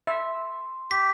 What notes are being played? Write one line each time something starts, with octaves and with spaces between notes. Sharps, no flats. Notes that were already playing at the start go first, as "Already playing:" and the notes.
E5 C6
G4 B6